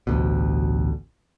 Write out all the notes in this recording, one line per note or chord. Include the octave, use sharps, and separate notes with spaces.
A1 D2 B2